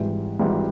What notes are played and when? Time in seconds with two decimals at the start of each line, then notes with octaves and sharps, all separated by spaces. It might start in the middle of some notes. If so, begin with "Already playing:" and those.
Already playing: G#1 G#2 E3 G3
0.39 G#1 G#2 E3 G3